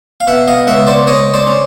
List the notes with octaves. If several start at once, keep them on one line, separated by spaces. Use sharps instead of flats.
F5
B2 E5 F#5
D#5 F5
C#2 E5 F#5
C5 D5
G#3 C#5 D#5
C5 D5
C#4